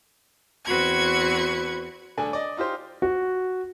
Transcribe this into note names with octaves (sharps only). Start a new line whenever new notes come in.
E2 C4 F#4 B4 C#6 G#6
D#1 A3 D4 G#5
D5 D#5
D#4 F4 G4 C5
F#4